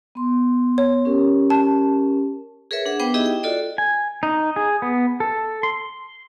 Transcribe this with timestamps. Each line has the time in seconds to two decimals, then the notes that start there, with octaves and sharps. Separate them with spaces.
0.15 B3 C6
0.78 C#5
1.05 C#4 G4 A#4
1.50 A5
2.71 G#4 A#4 B4 C#5 E5
2.86 D4 G#4 F#5
2.99 B3 B4 C5 G5 D6
3.14 D#4 E4 G4 G#4 D#5 E5
3.26 G5
3.43 F4 F#4 A4 D5 D#5
3.78 G#5
4.23 D#4
4.56 G#4
4.82 B3
5.20 A4
5.63 C6